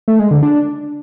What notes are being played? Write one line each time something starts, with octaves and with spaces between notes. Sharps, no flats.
A3
G#3
D3
D4